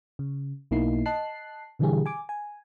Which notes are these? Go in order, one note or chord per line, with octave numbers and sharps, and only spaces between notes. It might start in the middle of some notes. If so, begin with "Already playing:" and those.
C#3
B1 B2 A#3 D#4 E4 C7
D#5 A5 F#6 C7
B2 D3 E3 G3 G4 G#4
G#5 D6
G#5